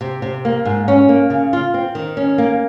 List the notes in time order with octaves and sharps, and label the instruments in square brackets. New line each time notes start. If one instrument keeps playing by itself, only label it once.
[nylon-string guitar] C3
C3
A#3
G#2
C#4
A#3
C#3
F4
C4
D#3
C#4
A#3